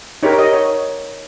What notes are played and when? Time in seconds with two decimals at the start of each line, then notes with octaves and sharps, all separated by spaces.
0.23 D#4 G4 A#4 C#5
0.33 C#5
0.39 D#5
0.53 C#5